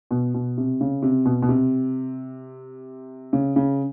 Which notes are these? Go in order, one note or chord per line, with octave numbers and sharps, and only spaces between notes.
B2
B2
C3
C#3
C3
B2
B2
C3
C#3
C#3